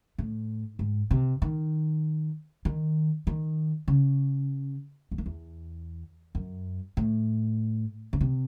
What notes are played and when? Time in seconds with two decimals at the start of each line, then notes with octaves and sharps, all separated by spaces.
0.18 A2
0.79 G#2
1.11 C3
1.42 D#3
2.65 D#3
3.27 D#3
3.88 C#3
5.11 E2
5.18 F#2
5.26 E2
6.35 F#2
6.97 A2
8.13 C#3
8.21 C3